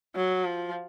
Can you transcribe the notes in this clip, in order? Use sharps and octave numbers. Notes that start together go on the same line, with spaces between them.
F#3
F3